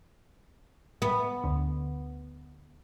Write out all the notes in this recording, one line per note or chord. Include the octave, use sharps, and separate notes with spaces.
B3
D2 D3